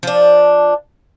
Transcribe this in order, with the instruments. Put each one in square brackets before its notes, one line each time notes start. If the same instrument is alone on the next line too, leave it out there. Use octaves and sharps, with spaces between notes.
[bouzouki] F3 D4